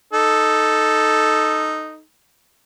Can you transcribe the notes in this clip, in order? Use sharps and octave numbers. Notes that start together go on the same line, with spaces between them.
D#4 A4